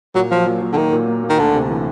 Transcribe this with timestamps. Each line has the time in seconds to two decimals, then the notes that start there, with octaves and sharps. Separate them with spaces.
0.15 A#2 F#3
0.31 F3 F#3
0.46 A#2
0.62 A#2
0.73 D3
0.77 D#3 A#3
0.93 A#2
1.08 A#3
1.24 A#3
1.30 D#3
1.39 D2 D3
1.55 C3
1.70 E3